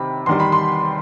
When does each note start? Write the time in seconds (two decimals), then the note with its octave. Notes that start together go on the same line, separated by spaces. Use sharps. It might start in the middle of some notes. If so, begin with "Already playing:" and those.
Already playing: C3 D#3 B5
0.26 E2 D#3 G3 C6
0.40 B5
0.52 C6